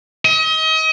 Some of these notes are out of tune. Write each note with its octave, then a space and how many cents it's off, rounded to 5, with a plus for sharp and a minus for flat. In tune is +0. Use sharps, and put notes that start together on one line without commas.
D#5 +35